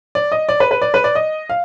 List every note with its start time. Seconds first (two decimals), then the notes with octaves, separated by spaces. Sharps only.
0.15 D5
0.32 D#5
0.49 D5
0.60 B4
0.71 B4
0.82 D5
0.94 B4
1.04 D5
1.15 D#5
1.49 F5